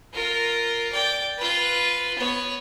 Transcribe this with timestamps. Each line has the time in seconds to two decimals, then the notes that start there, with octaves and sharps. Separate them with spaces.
0.13 F4 A#4
0.92 D5 G5
1.38 F4 B4
2.18 B3 C#5